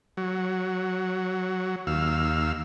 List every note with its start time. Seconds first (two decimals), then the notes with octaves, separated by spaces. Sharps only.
0.17 F#3
1.87 D#2 F5 E6